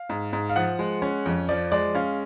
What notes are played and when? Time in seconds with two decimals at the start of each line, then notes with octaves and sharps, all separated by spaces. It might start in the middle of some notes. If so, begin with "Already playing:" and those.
Already playing: F5
0.09 G#2
0.33 G#2
0.50 F5
0.56 F3 F#5
0.79 G#3
1.02 C#4
1.26 F2
1.49 F3 D5
1.72 G#3 D5
1.95 C#4 F5